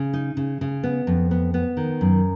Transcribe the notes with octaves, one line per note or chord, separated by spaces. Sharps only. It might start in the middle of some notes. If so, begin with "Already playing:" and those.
Already playing: C#3
D#4
C#3
C#3
B3
F2
B3
B3
D#3
F#2